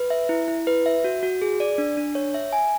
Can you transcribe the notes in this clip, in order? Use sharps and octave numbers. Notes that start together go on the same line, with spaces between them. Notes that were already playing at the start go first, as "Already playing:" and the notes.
Already playing: B4
E5
E4
E4
B4
E5
F#4
F#4
G#4
D5
D4
D4
C#5
E5
G#5